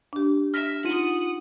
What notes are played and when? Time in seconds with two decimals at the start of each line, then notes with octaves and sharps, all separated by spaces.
0.13 D4 G4
0.54 E5 F6 A#6 B6
0.85 D#4 F4 F#5 D#6 D#7